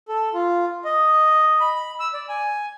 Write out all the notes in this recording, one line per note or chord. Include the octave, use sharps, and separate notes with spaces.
A4
F4
D#5
B5
E6
D5
G#5